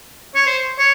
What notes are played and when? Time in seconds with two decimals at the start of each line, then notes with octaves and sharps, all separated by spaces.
0.35 C#5
0.47 C5
0.78 C#5